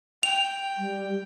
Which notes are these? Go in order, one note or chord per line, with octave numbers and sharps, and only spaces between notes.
G5 F7
G3